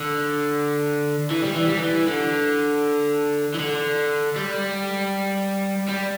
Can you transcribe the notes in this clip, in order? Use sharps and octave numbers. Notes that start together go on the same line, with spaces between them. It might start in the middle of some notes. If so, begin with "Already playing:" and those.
Already playing: D3
E3
G3
E3
G3
E3
D3
E3
D3
G3
G3